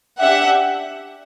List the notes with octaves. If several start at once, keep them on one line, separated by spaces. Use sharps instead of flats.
D4 G4 E5 F#5